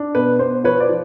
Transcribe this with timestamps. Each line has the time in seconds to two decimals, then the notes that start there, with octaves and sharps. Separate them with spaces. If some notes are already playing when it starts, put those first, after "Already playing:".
Already playing: D4
0.15 B2 B4
0.39 B2 C5
0.64 F3 B4 C#5
0.80 C5 D5
0.89 F3